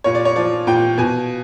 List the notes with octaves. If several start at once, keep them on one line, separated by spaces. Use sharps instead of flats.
A#2 C#5
D5
C#5
F3 D5
A#2 G5
B2 G#5